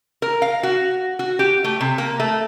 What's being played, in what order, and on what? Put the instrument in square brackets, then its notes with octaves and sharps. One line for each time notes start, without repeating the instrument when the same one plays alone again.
[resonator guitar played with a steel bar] A#4
F5
F#4
F#4
G4
A3
C3
A#3
A3